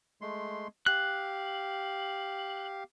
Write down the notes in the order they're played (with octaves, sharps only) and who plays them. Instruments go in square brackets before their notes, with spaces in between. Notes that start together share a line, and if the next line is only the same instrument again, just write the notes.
[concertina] G#3 A3 C6
[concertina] G4 F5 [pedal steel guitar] F#6